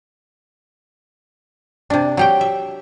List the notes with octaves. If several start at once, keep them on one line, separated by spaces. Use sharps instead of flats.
C3 D4
F#3 G4 G5
E5